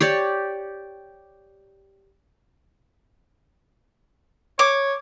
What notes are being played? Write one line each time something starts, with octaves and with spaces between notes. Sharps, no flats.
G4 C#5 D5
C#5 D6